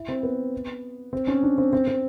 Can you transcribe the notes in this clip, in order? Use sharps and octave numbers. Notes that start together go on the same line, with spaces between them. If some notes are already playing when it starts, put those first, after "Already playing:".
Already playing: E4
C4
B3
C4
C#4
D4
C4
C4
C4